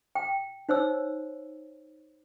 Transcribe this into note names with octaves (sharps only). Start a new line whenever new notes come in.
G5
D#4 C5 C#5 E6